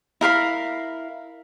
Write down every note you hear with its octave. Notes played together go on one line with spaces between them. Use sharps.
E4 A#4 F5 B5